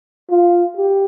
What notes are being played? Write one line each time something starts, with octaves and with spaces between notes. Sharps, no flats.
F4
G4